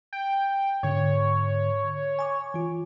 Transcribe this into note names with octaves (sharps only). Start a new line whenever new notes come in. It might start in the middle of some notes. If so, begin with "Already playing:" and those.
G5
G#2 D3 C#5
G#5 C#6 D6
E3 F4